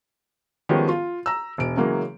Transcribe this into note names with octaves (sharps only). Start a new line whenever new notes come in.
D#3 F3 G3 G#3 B3 C#4
F4
A#5 E6
E1 D7
C#3 E3 F#3 G#3 A#3